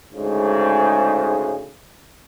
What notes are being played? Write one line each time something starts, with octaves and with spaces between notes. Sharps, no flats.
D2 G#2 C#3 G#3